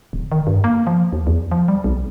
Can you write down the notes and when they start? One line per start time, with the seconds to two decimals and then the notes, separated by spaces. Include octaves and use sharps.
0.13 D1
0.32 D#3
0.47 G2
0.64 A#3
0.87 F3
1.12 D#2
1.27 E2
1.52 F3
1.68 G3
1.84 B1